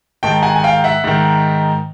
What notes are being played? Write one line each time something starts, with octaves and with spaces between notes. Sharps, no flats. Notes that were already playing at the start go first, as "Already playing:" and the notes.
G#2 D#3 G5 A5
F#5 G#5
G#5
F5 G5
E5 F#5
G#2 D#3